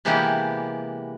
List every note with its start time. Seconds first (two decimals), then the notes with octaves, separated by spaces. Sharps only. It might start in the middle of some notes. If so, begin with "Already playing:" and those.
0.05 C3 E3 G#3 A#3 B3 G4